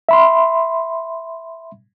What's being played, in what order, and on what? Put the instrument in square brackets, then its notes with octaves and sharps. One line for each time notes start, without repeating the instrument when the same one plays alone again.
[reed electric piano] E5 B5 C6